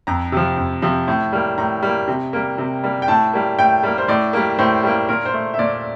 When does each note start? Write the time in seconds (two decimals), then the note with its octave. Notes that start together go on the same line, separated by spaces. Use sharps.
0.07 F2 A#5
0.32 C3 F3
0.57 F2
0.82 C3 F3
1.08 A2
1.33 G3 A#3
1.58 A2 A#5
1.82 G3 A#3
2.08 C3
2.33 G3 A#3
2.58 C3
2.84 G3 A#3
3.02 G5
3.08 A2 A5
3.33 G3 A#3
3.58 A2 G5
3.83 G3 A#3
3.98 C5
4.08 A2 D5
4.33 G3 A#3
4.58 A2 C5
4.83 G3 A#3
5.09 A#2 A#4
5.25 C5
5.34 A3
5.54 E5
5.59 A#2 D5